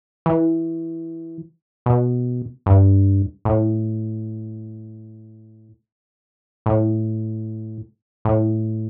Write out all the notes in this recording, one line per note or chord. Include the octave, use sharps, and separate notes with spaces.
E3
B2
G2
A2
A2
A2